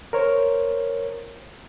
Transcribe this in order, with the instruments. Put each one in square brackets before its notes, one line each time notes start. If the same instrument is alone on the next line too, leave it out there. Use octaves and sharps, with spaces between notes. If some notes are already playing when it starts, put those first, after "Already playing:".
[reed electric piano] A#4 C5 C#5